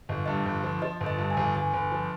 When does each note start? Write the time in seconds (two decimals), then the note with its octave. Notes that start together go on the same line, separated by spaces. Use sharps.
0.09 G1 D#5
0.17 F5
0.26 G2 D#5
0.46 G1
0.64 F3
0.82 F3 D#5
1.01 G1
1.06 D#5
1.18 G2
1.30 G#5
1.37 G1
1.55 G1 G#5
1.73 G1
1.92 F3